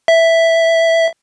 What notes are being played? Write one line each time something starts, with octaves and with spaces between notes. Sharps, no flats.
E5